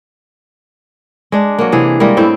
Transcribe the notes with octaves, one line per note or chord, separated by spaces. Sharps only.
G#3 D4
F#3 A#3
C3 E3 G#4
G3 G#3 A#3
A2 C4 E4 G5